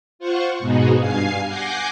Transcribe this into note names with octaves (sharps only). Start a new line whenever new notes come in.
F4 C5 F#5 C#6
G#2 B2 B3 D#4 F#4 G#4
G2 F5 G#5 C7
F#5 G#5 D6 G6 A#6 C7